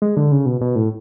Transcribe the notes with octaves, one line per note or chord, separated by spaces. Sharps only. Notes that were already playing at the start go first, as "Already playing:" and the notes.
G#3
D3
C#3
B2
B2
A2